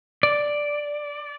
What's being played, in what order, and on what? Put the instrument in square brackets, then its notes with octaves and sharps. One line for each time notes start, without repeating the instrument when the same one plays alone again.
[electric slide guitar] D5